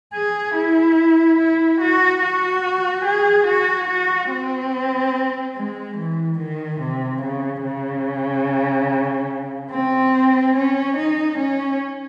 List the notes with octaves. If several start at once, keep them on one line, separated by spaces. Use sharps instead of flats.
G#4
E4
E4
F#4
F#4
G#4
F#4
F#4
C4
G#3
E3
D#3
C3
C#3
C#3
C4
C#4
D#4
C#4